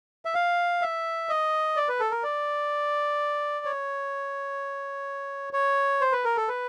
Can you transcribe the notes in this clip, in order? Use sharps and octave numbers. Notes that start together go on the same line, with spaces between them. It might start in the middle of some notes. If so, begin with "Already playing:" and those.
E5
F5
E5
D#5
D5
B4
A4
A#4
D5
C#5
C#5
C5
B4
A#4
A4
B4